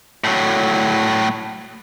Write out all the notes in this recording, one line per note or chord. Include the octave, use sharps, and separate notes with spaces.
A2 F#3